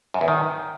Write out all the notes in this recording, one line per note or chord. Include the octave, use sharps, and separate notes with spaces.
F#2
E2
D#3